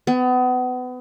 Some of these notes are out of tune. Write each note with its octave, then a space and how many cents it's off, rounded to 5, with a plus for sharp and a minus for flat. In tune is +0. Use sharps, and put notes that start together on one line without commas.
B3 +30